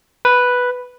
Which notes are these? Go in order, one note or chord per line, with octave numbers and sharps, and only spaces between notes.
B4